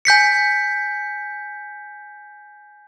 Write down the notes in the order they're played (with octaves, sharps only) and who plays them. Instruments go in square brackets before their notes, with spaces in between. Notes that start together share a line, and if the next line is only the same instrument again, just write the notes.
[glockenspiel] G#5 G6 B6 C#7